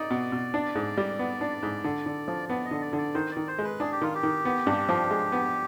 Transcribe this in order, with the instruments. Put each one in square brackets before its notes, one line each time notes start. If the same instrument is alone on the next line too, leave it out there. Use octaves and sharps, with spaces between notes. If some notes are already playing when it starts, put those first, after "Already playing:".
Already playing: [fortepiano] D#4 [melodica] D5
[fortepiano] B2
B2
D4
G#2
G3
B3
D4
G#2
D3
D3
F3
[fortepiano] B3 [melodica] D5
[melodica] D#5
[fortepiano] D3
[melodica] D5
[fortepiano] D3
[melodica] D5
[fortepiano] D#3 [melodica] C5
[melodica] D5
[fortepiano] D#3
[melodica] C5
[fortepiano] G#3
[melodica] B4
[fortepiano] D4 [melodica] G#4
[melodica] G4
[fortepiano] D#3 [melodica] F4
[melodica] G4
[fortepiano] D#3
B3
G2
F3
G#3
B3